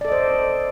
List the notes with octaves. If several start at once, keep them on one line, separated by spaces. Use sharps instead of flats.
A4 C5 D5 D#5